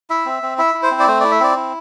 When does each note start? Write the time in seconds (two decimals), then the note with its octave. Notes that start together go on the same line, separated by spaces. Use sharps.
0.10 E4 E5
0.26 C4
0.42 C4
0.58 E4 E5
0.74 E4
0.83 C5
0.91 C4
1.00 D5
1.07 A3 C5
1.20 E4 D5
1.31 E5
1.40 C4 D5
1.57 E4